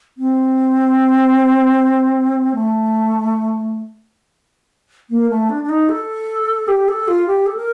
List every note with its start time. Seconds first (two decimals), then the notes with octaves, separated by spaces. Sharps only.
0.17 C4
2.54 A3
5.10 A#3
5.30 A3
5.49 D4
5.63 D4
5.69 D#4
5.89 A4
6.68 G4
6.88 A4
7.08 F4
7.27 G4
7.46 A4
7.56 A#4